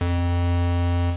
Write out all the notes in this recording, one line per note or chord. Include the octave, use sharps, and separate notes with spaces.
F2